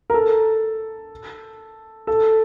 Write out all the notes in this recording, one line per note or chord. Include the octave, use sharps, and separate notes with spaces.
A#4
A4
A4